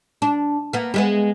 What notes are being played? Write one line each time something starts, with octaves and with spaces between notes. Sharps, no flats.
D4
A#3 B3
G3 G#3 B3